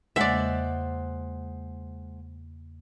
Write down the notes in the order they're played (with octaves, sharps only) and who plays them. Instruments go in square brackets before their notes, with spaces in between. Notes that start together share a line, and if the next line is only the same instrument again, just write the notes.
[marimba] E2 C#3 A#3 [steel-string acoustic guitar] G#3 C5 F#5 [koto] D5 E5